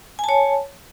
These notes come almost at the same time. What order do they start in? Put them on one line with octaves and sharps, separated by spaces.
G#5 A5 C#5